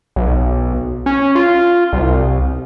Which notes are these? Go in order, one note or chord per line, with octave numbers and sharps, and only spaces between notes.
B1
C#4
F4
C2